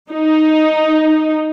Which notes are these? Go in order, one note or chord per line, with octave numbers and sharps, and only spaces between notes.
D#4